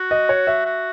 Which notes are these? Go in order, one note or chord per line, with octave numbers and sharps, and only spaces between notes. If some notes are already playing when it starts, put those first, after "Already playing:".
Already playing: F#4
D#5
C#5
E5
F#4